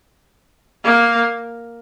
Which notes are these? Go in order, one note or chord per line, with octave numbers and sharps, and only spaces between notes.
A#3